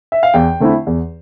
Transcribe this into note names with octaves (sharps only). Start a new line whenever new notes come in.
E5
F5
E2 G5
D3 A3 C4 E4
E2